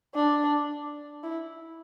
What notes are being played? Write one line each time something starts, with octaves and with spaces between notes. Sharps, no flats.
D4
E4